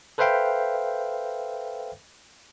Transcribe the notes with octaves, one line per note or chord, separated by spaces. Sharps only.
A4 B4 C5 E5 F5 G5